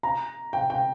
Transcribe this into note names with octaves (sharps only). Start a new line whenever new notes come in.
A#5
G5
G5